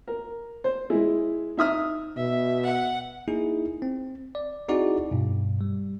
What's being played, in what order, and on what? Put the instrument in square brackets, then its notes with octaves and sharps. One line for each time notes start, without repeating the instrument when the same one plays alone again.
[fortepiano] A#4
C5
G#3 E4
D#4 E5 D#6 F6
[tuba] B2 [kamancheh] E5
[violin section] F#5
[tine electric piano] A#3 D#4 E4 G#4
C4
D5
C4 D#4 E4 F#4 G#4 D5
G2 B2
G3